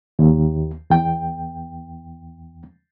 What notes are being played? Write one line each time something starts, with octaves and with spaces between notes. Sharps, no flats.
D#2
E2 G5